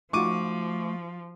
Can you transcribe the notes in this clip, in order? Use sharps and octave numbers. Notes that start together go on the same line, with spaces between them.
F3 A3 D#4 F4 F#4 C#6 D6 D#7